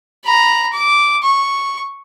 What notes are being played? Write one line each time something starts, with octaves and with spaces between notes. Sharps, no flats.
A#5 B5
D6
C#6